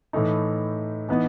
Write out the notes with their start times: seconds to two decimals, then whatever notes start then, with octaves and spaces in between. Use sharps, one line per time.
0.13 A2 E3 A3 D#4
1.09 E3 B3 D#4